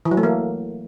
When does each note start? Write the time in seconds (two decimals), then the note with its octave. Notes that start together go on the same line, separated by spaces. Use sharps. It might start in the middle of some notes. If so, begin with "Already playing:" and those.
0.05 E3
0.11 F#3
0.17 A3
0.23 A#3